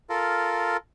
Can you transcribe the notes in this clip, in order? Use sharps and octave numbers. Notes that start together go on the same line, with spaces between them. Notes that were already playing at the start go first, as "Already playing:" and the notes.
F4 A4 A#4